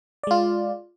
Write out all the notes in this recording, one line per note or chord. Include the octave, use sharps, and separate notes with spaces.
G#3 F4 D5